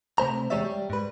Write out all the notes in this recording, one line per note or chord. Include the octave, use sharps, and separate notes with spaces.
C3 A3 C5 A#5
E2 G#3 G4 C#5 D5 E5
G3
G#2 B4